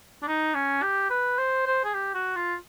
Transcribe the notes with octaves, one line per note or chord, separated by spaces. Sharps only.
D4
D#4
C#4
G4
B4
C5
C5
G#4
G4
F#4
F4